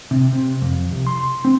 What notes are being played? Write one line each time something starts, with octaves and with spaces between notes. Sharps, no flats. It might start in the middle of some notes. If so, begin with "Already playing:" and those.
C3
C3
F2
C2
C6
C4